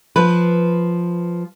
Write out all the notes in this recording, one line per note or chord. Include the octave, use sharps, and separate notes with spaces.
F3 B4